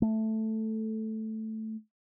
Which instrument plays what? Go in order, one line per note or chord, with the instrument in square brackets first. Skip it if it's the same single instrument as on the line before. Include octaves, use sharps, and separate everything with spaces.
[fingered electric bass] A3